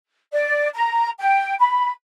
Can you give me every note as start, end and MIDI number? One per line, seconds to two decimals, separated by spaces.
0.32 0.68 74
0.73 1.10 82
1.18 1.54 79
1.59 1.90 83